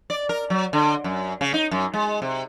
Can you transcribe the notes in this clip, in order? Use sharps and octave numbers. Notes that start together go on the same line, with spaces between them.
D5
A#4
F#3
D3
F#2
C#3
D#4
F#2
G#3
C3